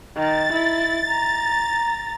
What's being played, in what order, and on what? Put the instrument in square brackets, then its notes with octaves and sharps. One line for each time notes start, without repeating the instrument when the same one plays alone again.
[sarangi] D#3 [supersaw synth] A6
[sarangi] E4
A#5